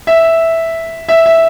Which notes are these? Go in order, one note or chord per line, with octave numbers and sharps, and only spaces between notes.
E5
E5
E5